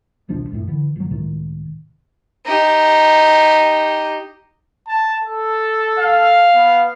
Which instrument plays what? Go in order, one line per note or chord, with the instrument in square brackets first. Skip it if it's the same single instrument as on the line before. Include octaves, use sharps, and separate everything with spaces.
[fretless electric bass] D#1 B1 F3 D4
C#2 F#2 A2
D3 E3
G1 F#3
C#2 A2 C3 D#3
[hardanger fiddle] D#4 G4
[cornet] A5
A4
[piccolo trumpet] F5
[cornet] B3